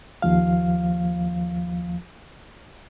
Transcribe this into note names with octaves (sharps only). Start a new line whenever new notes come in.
D#2 F3 F5